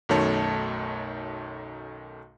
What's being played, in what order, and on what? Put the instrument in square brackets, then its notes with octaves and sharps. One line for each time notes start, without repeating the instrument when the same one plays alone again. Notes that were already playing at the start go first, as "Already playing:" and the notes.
[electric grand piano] B1 F#2 D#3 A3 C#5 A5